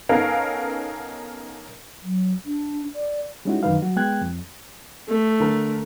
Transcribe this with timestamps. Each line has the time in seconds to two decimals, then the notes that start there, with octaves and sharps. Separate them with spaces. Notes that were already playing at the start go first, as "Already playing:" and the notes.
0.09 B3 C#4 D#4 A4 A#4 F5
2.03 F#3
2.45 D4
2.95 D5
3.45 G3 G#3 C#4 D#4 E4 F#4
3.63 F#2 D3 D#3 D#4 B4 F5
3.82 F#3 F#4
3.96 G#3 B3 G5 F#6 G#6
4.21 F2
5.08 A3
5.40 D3 A#4